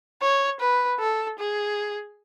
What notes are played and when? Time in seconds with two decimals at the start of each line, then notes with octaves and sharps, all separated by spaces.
0.21 C#5
0.60 B4
1.00 A4
1.39 G#4